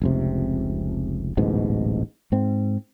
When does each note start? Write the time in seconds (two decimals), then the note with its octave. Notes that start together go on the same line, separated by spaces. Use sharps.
0.02 F1 C#2 C3
1.37 D1 A1 G#2 B2
2.32 G#2 C4